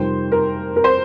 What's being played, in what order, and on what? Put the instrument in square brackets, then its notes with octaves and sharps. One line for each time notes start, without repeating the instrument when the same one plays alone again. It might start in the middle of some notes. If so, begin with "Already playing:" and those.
Already playing: [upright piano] F2 C3 D#3 G3 C5
A#4
A#4
C5